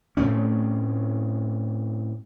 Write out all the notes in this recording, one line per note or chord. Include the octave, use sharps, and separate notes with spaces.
A2 A3 C4 C#4